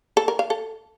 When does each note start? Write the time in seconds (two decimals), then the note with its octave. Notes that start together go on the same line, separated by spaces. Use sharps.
0.17 A4
0.28 A#4
0.39 F5
0.50 A4